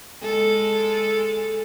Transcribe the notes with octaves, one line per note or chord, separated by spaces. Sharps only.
G#3 A4